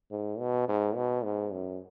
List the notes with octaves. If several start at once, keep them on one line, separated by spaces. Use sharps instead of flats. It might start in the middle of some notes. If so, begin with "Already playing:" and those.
G#2
B2
G#2
B2
G#2
F#2